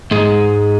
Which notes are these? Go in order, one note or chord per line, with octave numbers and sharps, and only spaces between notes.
G#2 G#3